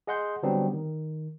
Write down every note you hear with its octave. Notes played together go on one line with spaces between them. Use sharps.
G#4 D#5 F#5 C6 G6
D3 F#3 G3 B3 C4 D4
D#3